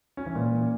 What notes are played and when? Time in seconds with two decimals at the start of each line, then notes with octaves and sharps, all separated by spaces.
0.17 C#4
0.26 E3
0.35 A#2